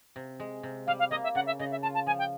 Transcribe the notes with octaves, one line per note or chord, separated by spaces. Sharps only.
C3
G#3
C3
G3 F5
F5
A#3 D#5
E5
C#3 F#5
E5
C#3 D#5
E5
F4 A5
A5
F3 G#5
G5